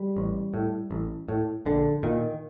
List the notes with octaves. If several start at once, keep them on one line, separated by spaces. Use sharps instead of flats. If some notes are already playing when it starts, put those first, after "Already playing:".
Already playing: G3
A1
A2
A1
A2
A#1 D3
A#2 D#3